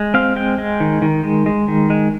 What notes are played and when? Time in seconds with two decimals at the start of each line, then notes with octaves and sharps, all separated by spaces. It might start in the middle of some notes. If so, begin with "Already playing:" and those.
Already playing: G#3
0.14 C4 F5
0.36 G#3 G5
0.58 G#3
0.80 D#3
1.02 D#3
1.24 G#3
1.46 G#3
1.68 D#3
1.90 G#3